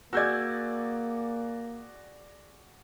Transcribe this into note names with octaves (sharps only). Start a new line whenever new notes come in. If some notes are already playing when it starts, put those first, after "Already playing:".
A#3 F#4 G#4 D5 E6 G6 G#6